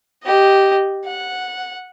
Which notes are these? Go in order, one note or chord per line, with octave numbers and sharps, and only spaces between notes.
G4 D#5
F#5